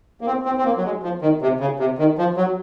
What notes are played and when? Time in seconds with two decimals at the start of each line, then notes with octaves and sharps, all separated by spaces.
0.21 A#3
0.27 C4
0.45 C4
0.57 C4
0.65 A#3
0.77 F#3
0.84 G#3
1.03 F3
1.22 D#3
1.42 C3
1.60 C#3
1.79 C3
1.98 D#3
2.18 F3
2.37 F#3